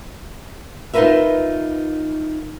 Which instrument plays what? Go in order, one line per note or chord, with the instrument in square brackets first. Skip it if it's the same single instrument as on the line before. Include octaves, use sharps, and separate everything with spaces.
[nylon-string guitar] D#4 F4 G4 A#4 B4 E5